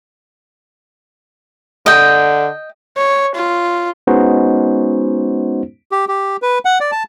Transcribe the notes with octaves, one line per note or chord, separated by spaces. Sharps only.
D3 D#5 G5
C#5
F4
G#3 B3 C#4 D#4 F#4 C5
G4
G4
B4
F#5
D5
A5